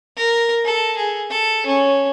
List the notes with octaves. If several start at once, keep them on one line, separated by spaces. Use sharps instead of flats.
A#4
A4
G#4
A4
C#4